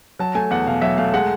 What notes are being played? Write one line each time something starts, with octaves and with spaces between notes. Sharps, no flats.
F#3 A5
A3 G#5
E2 F#5
B2 F5
F#3 E5
A3 F5
G#3 F#5